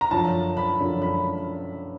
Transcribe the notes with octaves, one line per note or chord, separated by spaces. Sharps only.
A#5
F#2 D3 F3 A5
B5
F#2 D3 F3
B5